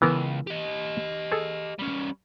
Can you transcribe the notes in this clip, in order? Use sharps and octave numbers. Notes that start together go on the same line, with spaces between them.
C#2 E3 B3 A#4
G4 D#5
G#4 A4
G3 C#4